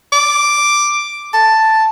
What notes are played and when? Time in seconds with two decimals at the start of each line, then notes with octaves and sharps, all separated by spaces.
0.12 D6
1.34 A5